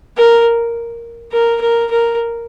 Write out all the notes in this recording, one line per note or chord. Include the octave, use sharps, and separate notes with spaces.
A#4
A#4
A#4
A#4